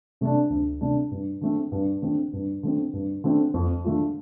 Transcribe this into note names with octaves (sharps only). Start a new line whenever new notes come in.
C3 A3 D4
D2
C3 A3 D4
G2
D3 A3 C4
G2
D3 A3 C4
G2
D3 A3 C4
G2
D3 A3 C4
F2
D3 A3 F4